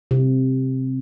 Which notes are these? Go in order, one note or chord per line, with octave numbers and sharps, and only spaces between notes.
C3